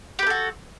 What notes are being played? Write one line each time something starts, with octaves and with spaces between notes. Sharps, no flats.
F#4 G4 A4 B4